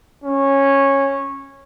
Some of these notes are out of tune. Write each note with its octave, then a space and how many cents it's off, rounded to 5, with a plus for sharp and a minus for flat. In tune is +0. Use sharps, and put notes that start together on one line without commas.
C#4 -10